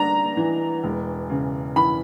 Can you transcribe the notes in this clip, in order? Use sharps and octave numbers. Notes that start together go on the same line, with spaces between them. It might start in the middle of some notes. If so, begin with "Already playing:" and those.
Already playing: G2 D4 A#5
E3
E1
C#3
E3 B5